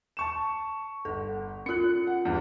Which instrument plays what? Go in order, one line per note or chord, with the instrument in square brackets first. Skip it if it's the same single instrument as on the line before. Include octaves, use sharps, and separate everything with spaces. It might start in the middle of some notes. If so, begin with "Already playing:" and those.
[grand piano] A5 C#6 E7
[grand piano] G1 [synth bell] A4
[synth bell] C#4 F4 [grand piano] F#6 C#7
[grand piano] F#5
E2 G2